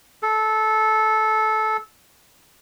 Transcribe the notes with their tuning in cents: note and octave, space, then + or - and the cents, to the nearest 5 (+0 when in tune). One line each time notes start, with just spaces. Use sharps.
A4 -15